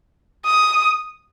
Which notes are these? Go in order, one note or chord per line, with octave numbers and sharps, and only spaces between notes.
D#6